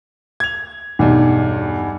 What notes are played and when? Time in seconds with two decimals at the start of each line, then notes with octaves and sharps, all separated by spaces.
0.40 G#6 F7
0.99 B1 E2 G2